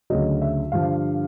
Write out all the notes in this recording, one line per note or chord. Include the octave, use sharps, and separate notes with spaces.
D2 C#3 F#3 D#5
E5
G2 D3 F3 F5